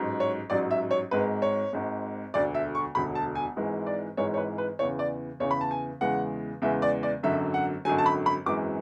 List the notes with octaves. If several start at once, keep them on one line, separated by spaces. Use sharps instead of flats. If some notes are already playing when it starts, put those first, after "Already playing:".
Already playing: A1 G#2 F#3
C#5
A1 G#2 F#3 D5
E5
C#5
G#1 G#2 G#3 B4
C#5
G#1 G#2 G#3
E1 D2 D3 D5
E5
C#6
E1 D2 D3 B5
A5
G#5
G#1 G#2 E3 G#3
D5
G#1 G#2 E3 G#3 C#5
C#5
B4
B4
E2 C#3 E3 C#5
D5
E2 C#3 E3 C#5
B5
A5
G#5
E2 C#3 E3 G#3 F#5
E2 C#3 E3 G#3 E5
D5
D5
G#1 F#2 D3 F#3 E5
F#5
G#1 F#2 D3 F#3 G#5
A5
B5
B5
G#1 F#2 E3 G#3 D6